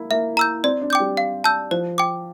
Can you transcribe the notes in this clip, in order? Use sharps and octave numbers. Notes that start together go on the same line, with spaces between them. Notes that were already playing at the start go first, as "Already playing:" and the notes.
Already playing: A#3 E4
A#3 E5
A#5 E6 G6
C4 D5
D4
G5 D6 G6
G3
F5
A5 E6 G6
F3 C5
G5 D6